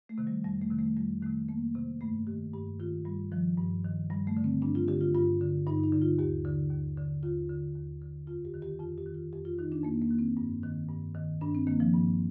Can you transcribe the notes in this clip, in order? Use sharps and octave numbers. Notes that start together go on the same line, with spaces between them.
A3
C3 D#3
G3
F2 G3
A3
C3 D#3
A3
F2 G3
C3 D#3 A3
F2 A#3
C3 D#3
G2 A3
D#3 G4
G2 G4
D#3 F4
G2 G3
D#3 F3
G2
D#3
G2 G3
A3
D3
C4
G2 D4
F4
D3 G4
F4
G2 F4
D3
G2 D#4
D#4
D3
F4
D#2 G4
D3
D#2
D3
D#2 F4
D3
D#2
D3
F2 F4
G4
D#3
G4
F2 F4
G4
D#3
F4
F2 G4
F4
D#3 D#4
D4
F2 A#3
A#3
D#3
C4
G2
D#3
G2
D#3
G2 D4
C4
D#3 A#3
F3
G2